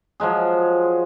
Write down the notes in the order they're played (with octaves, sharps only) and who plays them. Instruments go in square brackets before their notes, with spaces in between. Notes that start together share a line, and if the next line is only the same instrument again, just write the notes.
[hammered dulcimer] F3 F#3 G#3 G#4